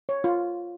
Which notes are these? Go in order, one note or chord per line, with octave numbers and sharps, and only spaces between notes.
C#5
F4